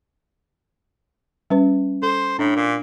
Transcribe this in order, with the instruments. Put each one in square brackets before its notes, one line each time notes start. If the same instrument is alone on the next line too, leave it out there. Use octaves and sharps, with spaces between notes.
[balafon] G3 C#4 B4
[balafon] A4 [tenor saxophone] C5
[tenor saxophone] A2 [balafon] D4
[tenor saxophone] A#2